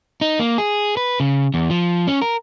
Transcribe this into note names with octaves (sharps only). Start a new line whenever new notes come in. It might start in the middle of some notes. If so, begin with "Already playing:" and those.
D#4
A#3
G#4
B4
C#3
E2
F3
C#4
A#4